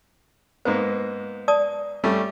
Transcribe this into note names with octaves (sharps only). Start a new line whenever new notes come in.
G#2 A#3 B3 C5
D5 A5 D#6
G3 A3 C#4